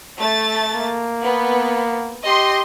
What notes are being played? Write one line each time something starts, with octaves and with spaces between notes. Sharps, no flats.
A3 A6
A#3
B3
G4 D#5 C6